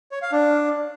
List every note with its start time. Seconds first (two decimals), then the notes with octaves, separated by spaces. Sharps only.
0.12 C#5
0.22 F5
0.32 D4